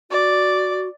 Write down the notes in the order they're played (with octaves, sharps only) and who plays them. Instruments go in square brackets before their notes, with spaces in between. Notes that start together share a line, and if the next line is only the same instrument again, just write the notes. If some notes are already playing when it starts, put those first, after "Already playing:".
[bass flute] F#4 [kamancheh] D5